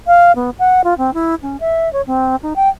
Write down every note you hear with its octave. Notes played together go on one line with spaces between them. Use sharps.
F5
B3
F#5
F4
C4
E4
C#4
E5
C#5
C4
D#4
G5